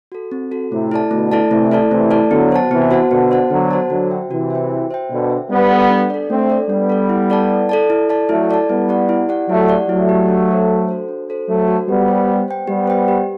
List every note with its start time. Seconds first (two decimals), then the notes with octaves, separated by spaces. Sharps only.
0.12 F#4 A4
0.32 C4
0.52 F#4 A4
0.71 A2 C3 A3
0.91 E4 A4 D5 A5
1.11 B2 D3 A3
1.32 E4 A4 D5 A5
1.51 C3 E3 A3
1.71 E4 A4 D5 A5
1.91 C3 E3 A3
2.11 E4 A4 D5 A5
2.31 D3 F#3 B3
2.51 F#4 C5 F#5 A5
2.71 C3 E3 B3
2.91 F#4 C5 F#5 A5
3.11 B2 D3 B3
3.31 F#4 C5 F#5 A5
3.50 D3 F#3 B3
3.71 F#4 C5 F#5 A5
3.90 D3 F#3 F#4
4.10 C5 E5 G5
4.30 C3 E3 F#4
4.50 C5 E5 G5
4.70 F#4
4.91 C5 E5 G5
5.10 B2 D3 F#4
5.30 C5 E5 G5
5.50 G3 B3 D4
5.70 A4 D5
5.90 D4
6.10 A4 D5
6.30 A3 C4 D4
6.50 A4 D5
6.69 G3 B3 D4
6.89 A4 D5
7.09 E4
7.30 A4 D5 A5
7.49 E4
7.69 A4 D5 A5
7.90 E4
8.10 A4 D5 A5
8.29 F#3 A3 E4
8.49 A4 D5 A5
8.69 G3 B3 E4
8.89 G4 D5 F#5
9.09 E4
9.29 G4 D5 F#5
9.49 F#3 A3 E4
9.69 G4 D5 F#5
9.88 F#3 A3 E4
10.09 G4 D5 F#5
10.28 D4
10.49 F#4 A4 C5
10.68 D4
10.88 F#4 A4 C5
11.08 D4
11.29 F#4 A4 C5
11.49 F#3 A3 D4
11.68 F#4 A4 C5
11.88 G3 B3 G4
12.08 C5 G5
12.29 G4
12.48 C5 G5
12.67 G3 B3 G4
12.87 C5 G5
13.08 G4